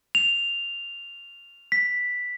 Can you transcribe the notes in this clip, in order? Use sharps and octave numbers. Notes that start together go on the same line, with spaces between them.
F7
B6